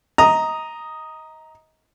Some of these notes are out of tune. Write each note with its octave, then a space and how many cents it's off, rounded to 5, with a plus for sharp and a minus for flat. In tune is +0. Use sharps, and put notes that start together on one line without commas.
D#5 +25 A#5 +0 D#6 +0